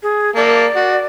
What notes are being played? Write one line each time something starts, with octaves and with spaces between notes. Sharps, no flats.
G#4
A#3 D5 A5
F#4